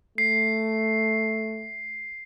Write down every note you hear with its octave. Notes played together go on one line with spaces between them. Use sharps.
A3 C7